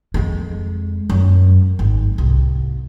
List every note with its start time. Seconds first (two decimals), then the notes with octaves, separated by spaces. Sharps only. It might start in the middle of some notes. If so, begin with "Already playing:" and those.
0.14 F2 G#3
1.10 F#2
1.79 G#1
2.18 C2